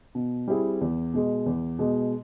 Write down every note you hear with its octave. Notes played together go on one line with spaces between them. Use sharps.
B2
G3 C4 E4 G#4
E2
B2 G#3
E2
B2 G#3